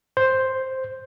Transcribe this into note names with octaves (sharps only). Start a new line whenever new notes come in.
C5